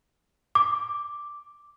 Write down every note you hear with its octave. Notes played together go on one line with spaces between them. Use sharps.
D6